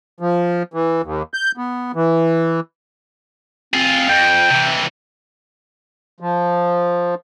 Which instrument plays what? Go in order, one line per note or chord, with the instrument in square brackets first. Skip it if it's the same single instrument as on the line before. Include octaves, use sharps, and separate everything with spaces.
[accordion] F3
E3
D#2
G6
B3
E3
[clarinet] C4 [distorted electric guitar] F4 G#4
[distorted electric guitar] F2 [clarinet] G5
[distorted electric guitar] C3 E3
[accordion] F3